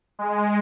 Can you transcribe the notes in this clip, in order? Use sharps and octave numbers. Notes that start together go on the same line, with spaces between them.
G#3